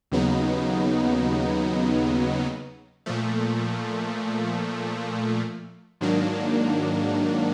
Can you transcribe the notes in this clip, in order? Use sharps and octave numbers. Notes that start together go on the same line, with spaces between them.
D#2 C#3 F#3 B3 D#4
A#2 F3 A3
G#2 D#3 F#3 A#3 D4